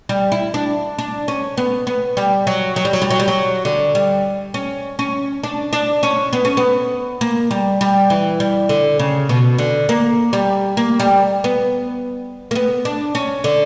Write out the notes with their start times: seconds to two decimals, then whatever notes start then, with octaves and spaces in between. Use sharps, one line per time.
0.09 G3
0.32 E4
0.54 D4
0.99 D4
1.28 C#4
1.57 B3
1.87 B3
2.17 G3
2.47 F#3
2.76 F#3
2.85 G3
2.93 F#3
3.02 G3
3.10 F#3
3.20 G3
3.28 F#3
3.65 D3
3.95 G3
4.54 C#4
4.99 C#4
5.43 D4
5.73 D4
6.03 C#4
6.33 B3
6.45 C#4
6.57 B3
7.21 A#3
7.51 G3
7.81 G3
8.10 E3
8.40 G3
8.69 D3
8.99 C#3
9.29 B2
9.58 D3
9.89 A#3
10.33 G3
10.77 A#3
11.00 G3
11.44 B3
12.51 A#3
12.55 B3
12.85 D4
13.15 C#4
13.44 D3